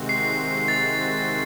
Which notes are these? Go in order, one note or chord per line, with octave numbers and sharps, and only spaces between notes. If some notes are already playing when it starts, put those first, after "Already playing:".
Already playing: C3 D#3 G#3 C4 F#4
C7
A6